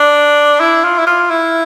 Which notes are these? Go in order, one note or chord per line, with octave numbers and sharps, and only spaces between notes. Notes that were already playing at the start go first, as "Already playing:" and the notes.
Already playing: D4
E4
F4
E4
F4
E4